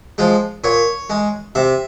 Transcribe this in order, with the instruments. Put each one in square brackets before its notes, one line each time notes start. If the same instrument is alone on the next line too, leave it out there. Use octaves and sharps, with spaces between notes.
[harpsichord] F3 G#3
A#2 C#5
G#3
C3 E5